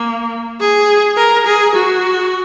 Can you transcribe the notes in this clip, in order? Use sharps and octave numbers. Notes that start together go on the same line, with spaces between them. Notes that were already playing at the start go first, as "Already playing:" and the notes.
Already playing: A#3
G#4
A#4
G#4
F#4